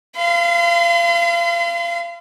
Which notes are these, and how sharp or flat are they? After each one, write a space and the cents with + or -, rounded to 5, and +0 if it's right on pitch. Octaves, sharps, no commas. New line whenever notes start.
F5 -30 C6 -45